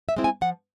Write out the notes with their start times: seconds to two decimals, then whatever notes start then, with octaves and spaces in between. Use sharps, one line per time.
0.09 E5
0.16 G#3 C4 E4
0.24 G#5
0.41 F3 F#5